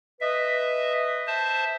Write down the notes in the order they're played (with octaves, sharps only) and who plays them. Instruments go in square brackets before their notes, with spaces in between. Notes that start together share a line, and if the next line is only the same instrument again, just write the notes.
[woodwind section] B4 D#5 [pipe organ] E5
[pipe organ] C5 E5 A5